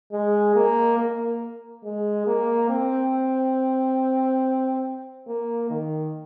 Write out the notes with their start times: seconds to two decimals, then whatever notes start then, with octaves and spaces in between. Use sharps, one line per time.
0.12 G#3
0.56 A#3
0.98 A#3
1.84 G#3
2.27 A#3
2.70 C4
5.27 A#3
5.70 D#3